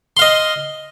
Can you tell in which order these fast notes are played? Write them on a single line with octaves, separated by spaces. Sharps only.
C6 F5 D#5